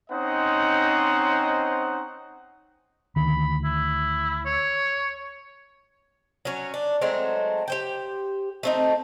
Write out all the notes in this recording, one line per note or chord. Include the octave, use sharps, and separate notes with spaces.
C4 C#4 D#4 C5 D#5 F#5
D2 D#3 B5
E4
C#5
F#3 C#4
D4
F#3 G#3 A3 C4
G4 C5 G5
A3 C4 D#4